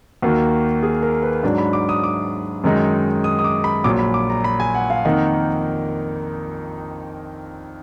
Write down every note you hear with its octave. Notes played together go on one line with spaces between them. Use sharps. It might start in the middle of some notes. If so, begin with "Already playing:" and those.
D#2 D#3 A#3 F#4
G#4
A#4
B4
G#2 F#3 D4 D5
B5
D6
D#6
D6
F#2 D#3 G#3 D#4
D#6
D#6
D6
B5
A#1 A#2 F#3 D6
B5
D6
A#5
B5
G#5
F#5
F5
F2 D#3 A#3 D#4 F#5